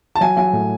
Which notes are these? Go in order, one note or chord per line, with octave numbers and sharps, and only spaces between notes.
A5
F#3 G#5
F#3 G#5
A2